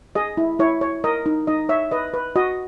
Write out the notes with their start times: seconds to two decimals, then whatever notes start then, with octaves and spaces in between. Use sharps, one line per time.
0.15 G#4 D#5
0.37 E4
0.59 E4 C#5
0.81 C#5
1.04 A#4 D#5
1.26 D#4
1.47 D#4 D#5
1.69 C#5 E5
1.91 B4 D#5
2.14 B4
2.36 F#4 D#5